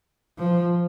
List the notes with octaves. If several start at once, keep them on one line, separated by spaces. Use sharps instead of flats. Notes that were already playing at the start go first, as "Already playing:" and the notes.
F3